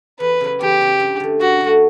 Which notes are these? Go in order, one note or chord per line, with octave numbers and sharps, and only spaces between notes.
E2 B4
C#3 F#3
E2 G4
C#3 F#3
G2
D3 A3
G2 F#4
D3 A3